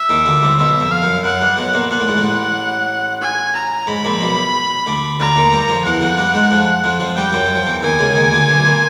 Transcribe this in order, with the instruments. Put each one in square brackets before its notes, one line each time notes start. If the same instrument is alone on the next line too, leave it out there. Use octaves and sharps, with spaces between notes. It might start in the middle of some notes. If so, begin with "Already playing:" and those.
Already playing: [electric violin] E5
[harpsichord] D#2 D#3
D2 D3
C2 C3
[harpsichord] B1 B2 [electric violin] E5
[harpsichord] F2
[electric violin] F5
[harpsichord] F#2
[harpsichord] F#2 [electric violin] F#5
[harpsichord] G2
B1 B2
A#1 A#2
[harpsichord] A#2 [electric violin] F#5
[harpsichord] A2
G#2
A1 A2
[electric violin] G#5
A#5
[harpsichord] G#2 [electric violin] B5
[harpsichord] A#1 A#2
B1 B2
D2 D3
[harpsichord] D2 D3 [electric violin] A#5
[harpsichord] D#2 D#3
G2 G3
F2 F3
[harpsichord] E2 E3 [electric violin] F#5
[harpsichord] F2 F3
G2 G3
G#2 G#3
F2 F3
F2 F3
F2 F3
[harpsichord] G2 G3 [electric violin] G5
[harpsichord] F#2 F#3
F#3
F3
E2 E3
[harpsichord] D#2 D#3 [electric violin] G#5
[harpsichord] C#2 C#3
D#2 D#3
D2 D3
B1 B2
A#2